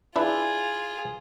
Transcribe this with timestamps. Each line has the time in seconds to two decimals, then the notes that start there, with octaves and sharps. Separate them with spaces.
0.16 D4 E4 F4 G#4 B4